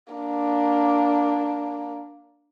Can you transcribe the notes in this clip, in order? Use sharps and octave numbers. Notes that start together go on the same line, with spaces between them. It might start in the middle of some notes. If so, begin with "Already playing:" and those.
A#3 D4